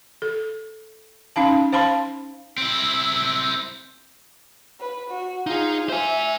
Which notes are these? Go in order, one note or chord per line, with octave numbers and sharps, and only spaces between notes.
A4
C#4 D#4 F5 A5
C5 F5 A5 B5 C6
C4 E4
B4
F#4
D#4 F4 G#4
C5 E5 G#5